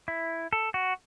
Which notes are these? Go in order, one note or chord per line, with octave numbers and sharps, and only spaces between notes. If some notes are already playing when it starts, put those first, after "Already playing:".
E4
A4
F#4